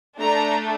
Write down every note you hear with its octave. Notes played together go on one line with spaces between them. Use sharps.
A3 D4 A4 A#5